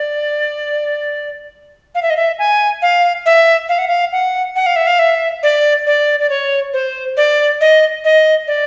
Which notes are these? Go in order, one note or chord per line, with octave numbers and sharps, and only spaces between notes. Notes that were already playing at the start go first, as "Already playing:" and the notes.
Already playing: D5
F5
E5
D#5
E5
G#5
F5
E5
F5
F#5
F5
F#5
F#5
F5
E5
F5
E5
D5
D5
D5
C#5
C5
D5
D#5
D#5
D5